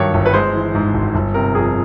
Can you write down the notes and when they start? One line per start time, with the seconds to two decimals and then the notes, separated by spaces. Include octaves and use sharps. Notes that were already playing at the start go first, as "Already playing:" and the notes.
Already playing: G2 D#3 F#3 C#5
0.14 G1
0.26 B4
0.33 G#3 C5
0.54 E3
0.75 G#2
0.94 G#1
1.15 G1
1.34 C3 A#4
1.55 F2 G#4